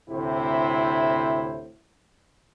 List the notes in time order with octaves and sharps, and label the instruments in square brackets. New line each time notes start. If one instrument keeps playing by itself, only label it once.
[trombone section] D2 A2 C3 E4 C5